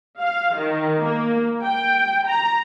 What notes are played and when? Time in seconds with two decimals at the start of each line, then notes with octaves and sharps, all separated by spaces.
0.20 F5
0.56 D#3
1.00 A#3
1.66 G5
2.27 A#5